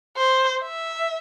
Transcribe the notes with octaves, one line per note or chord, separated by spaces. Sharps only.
C5
E5